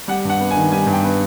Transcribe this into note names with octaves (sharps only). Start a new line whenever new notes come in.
G3 F#5
G2 F#5
B3
G#5
D#3
G3 G#5
G2
G5
B3